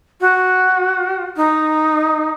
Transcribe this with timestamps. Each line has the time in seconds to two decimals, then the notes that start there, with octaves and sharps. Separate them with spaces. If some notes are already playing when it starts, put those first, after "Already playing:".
0.21 F#4
1.37 D#4